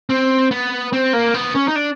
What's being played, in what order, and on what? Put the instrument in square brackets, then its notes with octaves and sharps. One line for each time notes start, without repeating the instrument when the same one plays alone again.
[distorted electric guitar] C4
B3
C4
A#3
B3
C#4
D#4
D4